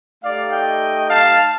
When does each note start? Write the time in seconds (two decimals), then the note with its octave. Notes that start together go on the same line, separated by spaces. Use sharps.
0.23 A3 D#4 G4 D5 F5
0.52 D#5 G5
1.10 F5 A5